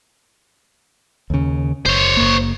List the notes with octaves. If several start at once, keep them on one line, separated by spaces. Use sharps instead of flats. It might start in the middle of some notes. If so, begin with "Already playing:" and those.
D#2 C#3
F#1 C5 C#5
F#1 A#3